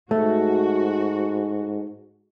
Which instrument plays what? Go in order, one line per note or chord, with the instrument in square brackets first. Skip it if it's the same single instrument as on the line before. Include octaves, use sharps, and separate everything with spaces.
[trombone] G#2 [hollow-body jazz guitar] A3 [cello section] F#4